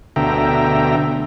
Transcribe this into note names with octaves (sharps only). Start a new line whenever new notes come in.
D2 B2 D3 E5 G5 A#5